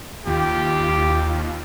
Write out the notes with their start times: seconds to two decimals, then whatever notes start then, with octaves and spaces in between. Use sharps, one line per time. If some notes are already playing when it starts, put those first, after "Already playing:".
0.27 D#2 F4 G4